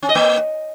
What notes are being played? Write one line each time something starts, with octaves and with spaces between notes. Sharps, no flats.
C#4
D#5
A#3